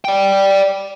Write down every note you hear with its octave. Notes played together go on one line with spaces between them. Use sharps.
D5 G5